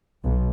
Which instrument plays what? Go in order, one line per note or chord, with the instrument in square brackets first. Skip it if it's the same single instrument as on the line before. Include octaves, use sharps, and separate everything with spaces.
[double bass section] B1